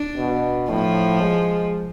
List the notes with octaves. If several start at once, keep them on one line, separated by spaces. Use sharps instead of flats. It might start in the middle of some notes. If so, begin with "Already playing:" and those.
Already playing: D4
B2
A2 F3
G#3